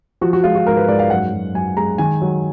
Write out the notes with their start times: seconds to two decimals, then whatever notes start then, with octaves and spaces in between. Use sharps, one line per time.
0.21 F3 F#4
0.33 F#4
0.44 G#3 F4
0.55 F#4
0.66 G#2 A#4
0.77 B4
0.88 G#2 D5
0.99 F5
1.10 F#2 F#5
1.32 F#2
1.54 F#2 G#5
1.77 G#3 A#5
1.98 D#3 G#5
2.22 F#3